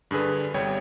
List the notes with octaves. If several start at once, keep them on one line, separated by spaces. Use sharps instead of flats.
G2 D3 G#4 B4
G1 C2 G3 C#5 G5 G#6